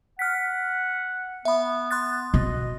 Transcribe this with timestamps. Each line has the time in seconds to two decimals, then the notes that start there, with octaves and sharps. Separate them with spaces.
0.19 F#5 F6 B6
1.45 B3 E5 B5
1.91 C6 F#6 A6
2.34 B2 D#5